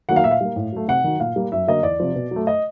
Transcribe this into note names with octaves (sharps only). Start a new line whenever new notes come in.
D#3 F#3 A#3 F#5
F5
A#2 E5
F5
G3 A#3
A2
F#3 A3
C3 F#5
D#3 F#3
A#2 F5
G3 A#3
F#2 E5
D3 F#3 A#3 D#5
E2 D5
C3 F3
B2
F#3 A3
D#5